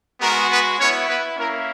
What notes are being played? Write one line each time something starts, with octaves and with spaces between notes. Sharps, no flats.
G#3 B3 F#4 A#4
B3 B4
B3 C#4 E4 C#5
B3 B4
A#3 C#4 E4 A#4